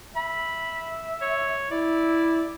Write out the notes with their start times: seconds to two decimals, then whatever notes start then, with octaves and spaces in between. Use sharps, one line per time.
0.16 E5 B5
1.22 C#5
1.71 E4 D5